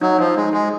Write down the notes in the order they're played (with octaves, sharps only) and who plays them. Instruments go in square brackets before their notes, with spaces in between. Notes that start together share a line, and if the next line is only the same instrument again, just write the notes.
[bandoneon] F#3 [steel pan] D#4
[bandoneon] F3 [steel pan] D#4
[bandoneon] G#3 [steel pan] D#4
[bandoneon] G#3 [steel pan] G#4